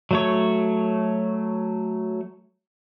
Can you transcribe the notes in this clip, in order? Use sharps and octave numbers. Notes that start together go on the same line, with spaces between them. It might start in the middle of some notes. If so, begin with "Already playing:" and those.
F#3 A3 C#5